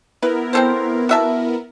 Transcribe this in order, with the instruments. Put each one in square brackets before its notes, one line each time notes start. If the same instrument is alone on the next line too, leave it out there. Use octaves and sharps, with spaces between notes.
[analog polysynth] B3 E4 A#4 [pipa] B4
[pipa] C4 A4 C5
F#4 E5 A5